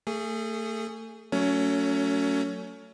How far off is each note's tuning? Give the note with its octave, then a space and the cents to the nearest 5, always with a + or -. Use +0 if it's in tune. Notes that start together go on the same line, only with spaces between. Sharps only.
A3 +30 G#4 -5
F#3 +0 A3 +30 C#4 +25